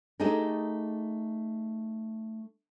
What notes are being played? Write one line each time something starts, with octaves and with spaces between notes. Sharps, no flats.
A3 D#4 G4 G#4 A#4